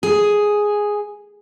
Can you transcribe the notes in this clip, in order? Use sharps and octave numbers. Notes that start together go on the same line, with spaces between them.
G#4